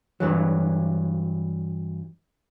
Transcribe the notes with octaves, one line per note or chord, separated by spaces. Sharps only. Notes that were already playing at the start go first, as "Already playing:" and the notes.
G2 A#2 E3 F#3